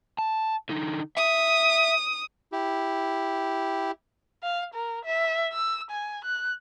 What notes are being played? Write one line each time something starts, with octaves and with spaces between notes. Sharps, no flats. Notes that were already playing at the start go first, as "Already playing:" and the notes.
A5
D3 D#4
E5 D#6
E4 G4
F5
A#4
E5
E6
G#5
F#6